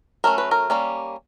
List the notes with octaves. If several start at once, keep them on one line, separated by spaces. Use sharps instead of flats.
F#3 A3 C#4 A#4
B4
A#4
G3 A#3 C#4